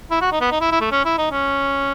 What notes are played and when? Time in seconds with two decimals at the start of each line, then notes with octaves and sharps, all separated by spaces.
0.11 E4
0.21 F#4
0.31 D#4
0.41 B3
0.51 D#4
0.61 E4
0.72 E4
0.81 A3
0.91 C#4
1.05 E4
1.18 D#4
1.31 C#4